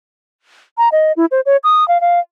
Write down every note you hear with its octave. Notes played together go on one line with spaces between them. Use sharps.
A#5
D#5
E4
C5
C#5
D#6
F5
F5